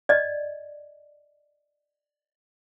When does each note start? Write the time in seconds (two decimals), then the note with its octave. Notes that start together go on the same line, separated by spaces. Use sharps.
0.09 D5 D#5